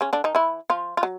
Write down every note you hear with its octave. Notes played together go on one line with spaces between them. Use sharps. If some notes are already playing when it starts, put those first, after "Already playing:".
C#3 C#4
D3 D4
D#3 D#4
E3 E4
F3 F4
F4
F#3